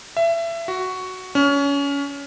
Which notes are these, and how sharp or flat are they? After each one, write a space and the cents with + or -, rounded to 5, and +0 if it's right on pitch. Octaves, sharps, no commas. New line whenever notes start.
E5 +25
F#4 +5
C#4 +25